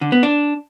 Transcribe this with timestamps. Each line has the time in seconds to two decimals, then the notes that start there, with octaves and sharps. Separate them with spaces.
0.01 D3
0.12 B3
0.23 D4